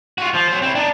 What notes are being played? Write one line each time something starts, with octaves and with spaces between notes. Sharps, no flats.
F4 F#4
F3 F4
F#3 C5
C4 E4
D4 D#4